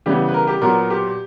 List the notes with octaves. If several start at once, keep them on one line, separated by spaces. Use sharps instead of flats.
C#3 E3 G3 B3 G4
B4
A#4
G4
A#2 F#3 B3 A#4
G4